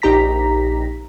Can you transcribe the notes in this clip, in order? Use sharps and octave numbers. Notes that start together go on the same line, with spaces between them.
A#1 D#4 G4 A#5 A#6 B6